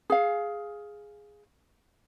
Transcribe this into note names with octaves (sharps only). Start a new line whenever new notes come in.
G#4 F5